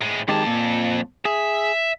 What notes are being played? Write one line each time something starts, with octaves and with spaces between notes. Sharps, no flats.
A2 G#3
F2 D#3 G#3 G4 A5
A#2
G#4 E5